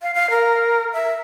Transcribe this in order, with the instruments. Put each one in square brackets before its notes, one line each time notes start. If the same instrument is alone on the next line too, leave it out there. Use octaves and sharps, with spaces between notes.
[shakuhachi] F5
F5
A#4
E5